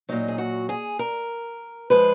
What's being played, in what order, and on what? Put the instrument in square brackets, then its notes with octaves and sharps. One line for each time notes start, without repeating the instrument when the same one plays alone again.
[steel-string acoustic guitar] A#2 F#3 D#4
G#4
F#4
G#4
A#4
F3 G#3 B4